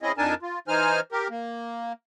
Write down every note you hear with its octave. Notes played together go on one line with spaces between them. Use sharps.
C4 C#4 E4 G#4 D#5
F2 D4 D#4 A#4 G#5 A5
F4
E3 D#4 C5 G#5 F6
G4 A#4
A#3